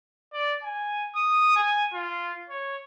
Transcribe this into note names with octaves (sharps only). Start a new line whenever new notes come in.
D5
G#5
D#6
G#5
F4
C#5